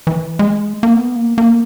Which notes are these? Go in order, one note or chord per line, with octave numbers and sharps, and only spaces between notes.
E3
G#3
A#3
B3
A#3
A#3